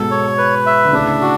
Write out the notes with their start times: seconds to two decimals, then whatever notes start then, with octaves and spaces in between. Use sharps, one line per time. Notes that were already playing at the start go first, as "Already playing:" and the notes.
Already playing: G#2 B2 A4
0.11 C#5
0.38 B4
0.66 E5
0.85 D3
0.93 A2 C#3 D4
1.21 F#4